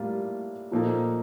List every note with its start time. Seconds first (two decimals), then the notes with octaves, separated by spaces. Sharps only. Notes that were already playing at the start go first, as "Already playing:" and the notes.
Already playing: A2 G3 A#3 F4
0.71 A#2 F3 A#3 D#4 A4